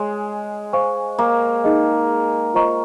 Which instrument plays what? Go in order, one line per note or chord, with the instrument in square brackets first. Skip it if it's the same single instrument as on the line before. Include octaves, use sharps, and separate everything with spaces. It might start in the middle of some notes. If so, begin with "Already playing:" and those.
Already playing: [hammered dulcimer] G#3 [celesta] C#5 G#5 C6
[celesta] C5 F5 G#5 C#6
[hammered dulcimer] A#3
[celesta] D#4 G#4 D#5
F4 C5 D#5 A#5 C#6